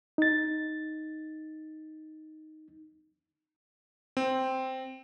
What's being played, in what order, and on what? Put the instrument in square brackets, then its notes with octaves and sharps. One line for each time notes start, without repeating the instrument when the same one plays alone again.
[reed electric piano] D#4 A6
[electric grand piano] C4